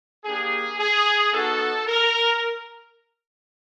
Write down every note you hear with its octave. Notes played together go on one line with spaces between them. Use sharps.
A#3 D4 G4 G#4
G#4
B3 D#4 F#4 A4
A#4